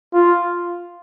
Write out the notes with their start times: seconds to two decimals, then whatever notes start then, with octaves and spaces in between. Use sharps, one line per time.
0.13 F4